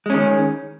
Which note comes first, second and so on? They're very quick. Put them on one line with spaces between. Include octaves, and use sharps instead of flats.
G#3 C#4 D#3